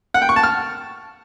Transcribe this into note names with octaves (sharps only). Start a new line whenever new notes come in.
F#5
G5
C#6
A5
F6